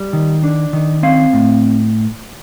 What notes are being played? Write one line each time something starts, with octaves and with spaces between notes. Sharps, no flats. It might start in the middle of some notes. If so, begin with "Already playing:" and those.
Already playing: G3
D#3
D4
D#3
C4 F5
A2